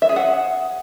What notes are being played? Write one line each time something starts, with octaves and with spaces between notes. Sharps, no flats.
E5
G#4
F#5